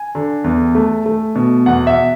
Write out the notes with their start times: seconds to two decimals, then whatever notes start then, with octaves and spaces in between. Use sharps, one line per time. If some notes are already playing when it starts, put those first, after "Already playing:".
Already playing: G#5
0.15 D3
0.44 E2
0.75 A3
1.06 A3
1.35 B2
1.66 E2 F#5
1.87 E5